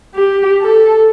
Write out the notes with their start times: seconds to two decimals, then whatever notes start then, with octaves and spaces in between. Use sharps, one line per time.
0.15 G4
0.61 A4